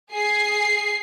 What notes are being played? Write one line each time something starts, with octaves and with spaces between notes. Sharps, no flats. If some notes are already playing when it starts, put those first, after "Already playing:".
G#4 C7